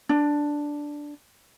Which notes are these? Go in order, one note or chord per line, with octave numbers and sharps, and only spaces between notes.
D4